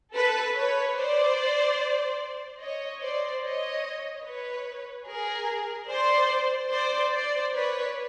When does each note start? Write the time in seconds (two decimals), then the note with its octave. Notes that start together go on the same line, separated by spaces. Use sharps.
0.14 A4 B4
0.55 B4 C#5
0.96 C5 D5
2.60 C#5 D#5
3.01 C5 D5
3.42 C#5 D#5
4.24 B4 C#5
5.07 G#4 A#4
5.89 C5 D5
6.71 C5 D5
7.12 C5 D5
7.54 B4 C#5